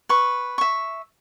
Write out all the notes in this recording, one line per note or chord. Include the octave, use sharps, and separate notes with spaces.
B4 C#6
E5 C#6